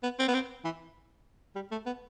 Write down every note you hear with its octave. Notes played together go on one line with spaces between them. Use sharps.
B3
C4
B3
C4
E3
G3
A3
B3